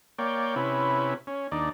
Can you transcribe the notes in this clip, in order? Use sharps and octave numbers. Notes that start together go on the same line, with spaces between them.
A#3 C#5 D5 G5
C3 C#4 E4 B4
C#4
D#2 D4 D#4 D5